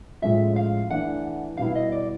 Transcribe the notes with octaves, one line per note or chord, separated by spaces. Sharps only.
A2 F3 G#3 C#4 F4 E5
F5
E3 A3 D4 F#5
B2 G3 B3 E4 F5
D#5
D5